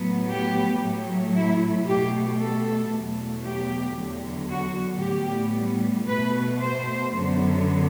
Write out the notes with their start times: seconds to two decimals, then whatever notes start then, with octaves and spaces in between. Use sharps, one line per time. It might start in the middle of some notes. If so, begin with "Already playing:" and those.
Already playing: A2 F#3 B3
0.30 G4
0.83 A2 F#3 A3
1.35 E4
1.87 B2 A3 G4
2.40 A4
2.93 E2 B2 F#3 A3
3.45 G4
3.98 E2 D3 F#3
4.51 F#4
5.03 A2 G3 B3 G4
6.09 B2 A3 B4
6.61 C5
7.14 F#2 D3 F#3 B3